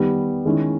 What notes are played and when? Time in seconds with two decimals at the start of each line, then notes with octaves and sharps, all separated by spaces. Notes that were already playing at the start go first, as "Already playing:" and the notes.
Already playing: D#3 G3 B3
0.45 D#3 G#3 C#4 E4